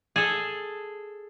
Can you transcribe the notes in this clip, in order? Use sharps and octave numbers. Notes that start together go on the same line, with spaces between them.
G#4 A4